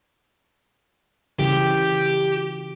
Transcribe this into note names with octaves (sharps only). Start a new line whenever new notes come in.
C#3 E3 G3 G4